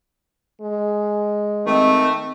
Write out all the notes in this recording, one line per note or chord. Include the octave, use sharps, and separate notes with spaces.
G#3
D#3 A3 C4